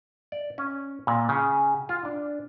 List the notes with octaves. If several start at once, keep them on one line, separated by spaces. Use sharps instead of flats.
D5
C#4
A#2
C#3
F4
D4